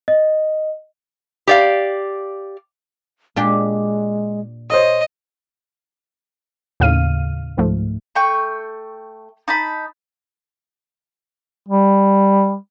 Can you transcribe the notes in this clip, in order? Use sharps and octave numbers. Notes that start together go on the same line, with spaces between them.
D#5
G4 D5 F5
A#2 G#3 D4 G4
C5 C#5 D#5 D#6
D#2 A2 C#3 F5 F6 D#7
C#2 G#2 F3 A3
A3 G5 C#6
D#4 A5 B5
G3